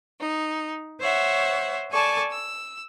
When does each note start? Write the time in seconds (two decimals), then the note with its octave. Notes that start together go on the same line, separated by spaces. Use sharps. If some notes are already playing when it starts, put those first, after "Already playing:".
0.19 D#4
0.99 C5 C#5 E5 F#5
1.90 A4 D5 G#5 A5 C#6
2.31 E6